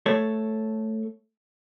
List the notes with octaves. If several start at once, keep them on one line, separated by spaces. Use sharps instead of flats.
A3 A4 C#5